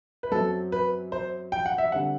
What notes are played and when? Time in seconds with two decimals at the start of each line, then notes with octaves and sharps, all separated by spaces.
0.23 B4
0.32 F#2 F#3 C4 A4
0.72 B4
1.12 C5
1.52 G5
1.66 F#5
1.78 E5
1.92 D3 G3 C4 F#5